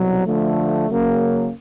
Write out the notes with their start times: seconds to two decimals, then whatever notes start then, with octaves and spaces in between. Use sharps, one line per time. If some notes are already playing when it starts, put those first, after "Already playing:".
Already playing: C2 B2 F#3
0.26 D3 F3 A3
0.88 C#3 F#3 A#3 C#4